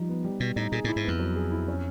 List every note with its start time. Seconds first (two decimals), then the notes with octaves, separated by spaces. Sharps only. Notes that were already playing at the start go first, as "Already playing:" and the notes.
Already playing: F3 G3 D#4
0.09 B3
0.24 G3
0.40 B2 G3
0.56 A2 D#4
0.72 A#2 G#4
0.84 A2 E4
0.96 G#2
1.04 F2 B3
1.19 F#3
1.36 G#4
1.52 E4
1.68 C#4